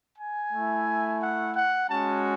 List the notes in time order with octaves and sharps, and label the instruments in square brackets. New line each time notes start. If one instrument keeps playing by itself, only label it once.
[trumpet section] G#5
A3 E4
F#5
F#5
G#3 C#4 F#4 A5